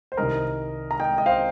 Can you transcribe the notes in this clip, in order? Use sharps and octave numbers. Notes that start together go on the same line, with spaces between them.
C5
C2 C3 D#3 G3 A#4 D#5
A#5
D#5 G5
D#5
C5 F5